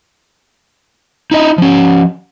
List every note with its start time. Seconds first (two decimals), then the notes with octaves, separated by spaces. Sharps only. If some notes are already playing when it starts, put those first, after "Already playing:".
1.31 D#4 E4 D#5
1.58 F3 C#4